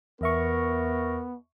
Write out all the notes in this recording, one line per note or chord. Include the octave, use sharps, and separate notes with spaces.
E2 B3 A#4 E5 C#6